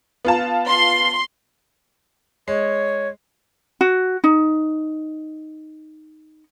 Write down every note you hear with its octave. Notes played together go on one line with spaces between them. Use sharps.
B3 F4 A5
C6
G#3 C#5
F#4
D#4